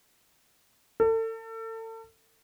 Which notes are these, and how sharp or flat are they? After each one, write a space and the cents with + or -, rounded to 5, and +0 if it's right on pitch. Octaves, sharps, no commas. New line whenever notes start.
A4 +35